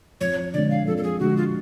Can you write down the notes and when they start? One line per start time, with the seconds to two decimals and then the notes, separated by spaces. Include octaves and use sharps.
0.21 F2 C#5
0.54 D3 G#3 D5
0.70 F5
0.87 F2 A4
0.97 A4
1.03 G#4
1.20 D3 G#3 F#4
1.37 F4